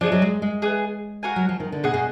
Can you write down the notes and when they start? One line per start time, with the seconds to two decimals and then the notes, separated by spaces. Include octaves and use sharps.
0.01 F3 D4 G#4 D#5
0.12 F#3
0.22 G#3
0.42 G#3
0.62 B3 D4 G#4
1.23 F#4 A#4 F5 G#5
1.36 F#3
1.49 F3
1.60 D#3
1.72 D3
1.84 B2 G#4 D#5 F#5
1.94 B2